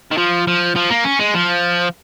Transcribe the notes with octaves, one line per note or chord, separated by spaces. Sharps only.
D#3
F3
F3
F3
A#3
C#4
G#3
F3